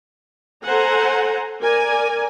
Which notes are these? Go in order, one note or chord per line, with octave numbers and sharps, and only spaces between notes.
A4 C5 F#5 G#5 A#5
A#4 D5 G#5